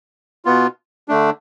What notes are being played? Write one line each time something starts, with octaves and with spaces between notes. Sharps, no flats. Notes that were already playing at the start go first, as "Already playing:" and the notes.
B2 B3 F4
D3 A3 D4